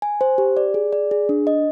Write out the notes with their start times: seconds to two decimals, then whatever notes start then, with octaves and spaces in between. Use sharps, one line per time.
0.02 G#5
0.21 C5
0.38 G4
0.57 D5
0.74 G#4
0.93 D5
1.11 G#4
1.29 D4
1.47 D#5